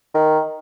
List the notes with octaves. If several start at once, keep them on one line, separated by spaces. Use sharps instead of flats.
D#3